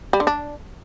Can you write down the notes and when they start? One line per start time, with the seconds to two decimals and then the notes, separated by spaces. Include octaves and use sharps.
0.13 G3
0.20 D3
0.27 D4